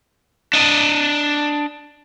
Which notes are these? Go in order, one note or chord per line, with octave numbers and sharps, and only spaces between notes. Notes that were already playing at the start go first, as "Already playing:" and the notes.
D4 D#5